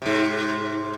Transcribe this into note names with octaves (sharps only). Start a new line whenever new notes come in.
G#2 C3